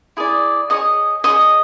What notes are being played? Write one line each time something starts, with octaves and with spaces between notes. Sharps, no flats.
E4 G#4 D5
G#4 C#5 D#5 D#6
G#4 C#5 D#5 D#6